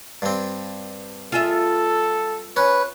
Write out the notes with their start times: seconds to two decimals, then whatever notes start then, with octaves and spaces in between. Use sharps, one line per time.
0.22 G2 C4
1.32 F4 G#4 A4 E5
2.56 C#4 B4